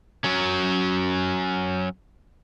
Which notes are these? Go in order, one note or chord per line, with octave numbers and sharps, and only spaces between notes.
F#3 C#4